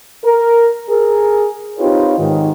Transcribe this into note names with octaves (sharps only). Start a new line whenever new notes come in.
A#4
G#4 A#4
C4 D#4 F4 G4 B4 C#5
G#2 D#3